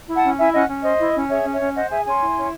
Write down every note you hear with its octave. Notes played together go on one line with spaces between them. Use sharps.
E4
F#5 A5
C#4
E4 E5 G#5
C#4 D#5 F#5
C#4
C5 D#5
E4
C#4
G#4 C#5 E5
C#4
C#5 E5
C#4
C5 D#5 F#5
G#4 E5 G#5
C#4 G#5 C6
E4
C#4